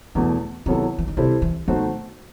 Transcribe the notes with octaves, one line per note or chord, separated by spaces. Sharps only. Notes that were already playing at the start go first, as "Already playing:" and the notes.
E2 B2 E3 A3
C3 D#3 F#3 B3 E4 A4
E3
D#3
C3 G3 C4 E4 A4 C5
E3
B2 D#3 A3 D#4 F#4 C5